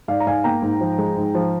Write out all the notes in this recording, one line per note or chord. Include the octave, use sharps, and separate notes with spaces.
G#2 D5 F5
A#5
G#2 F5 G#5
A#3 G5 A#5
G#2
F3
G#3
G#2
F3